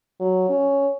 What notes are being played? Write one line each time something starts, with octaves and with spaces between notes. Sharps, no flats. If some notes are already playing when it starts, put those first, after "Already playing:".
F#3
C#4